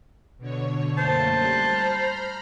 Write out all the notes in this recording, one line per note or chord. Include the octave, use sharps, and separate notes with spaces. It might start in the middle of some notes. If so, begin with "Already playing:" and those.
B2 D3 C#5
F#2 A3 A#3 C5 A5
G3 F#6
A#5 B5 F6